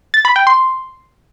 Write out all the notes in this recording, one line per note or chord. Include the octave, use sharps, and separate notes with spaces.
A6
B5
G5
C6